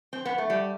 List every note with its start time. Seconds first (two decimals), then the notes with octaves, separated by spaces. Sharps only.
0.13 C4
0.25 B3
0.38 A3
0.50 G3